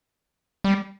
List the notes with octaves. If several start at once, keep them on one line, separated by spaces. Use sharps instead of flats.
G3